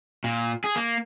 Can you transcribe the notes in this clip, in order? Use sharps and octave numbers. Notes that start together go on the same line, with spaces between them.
A#2
G#4
A#3